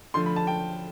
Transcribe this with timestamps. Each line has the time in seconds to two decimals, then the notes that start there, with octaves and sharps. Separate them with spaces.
0.14 D3 F3 A3 C6
0.26 B5
0.36 A5
0.47 G5